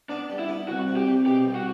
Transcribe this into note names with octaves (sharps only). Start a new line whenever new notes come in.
B3 D4
G3
E4
B3
C2 F#4
C3
G4
C3
B2 G4
C2
F#4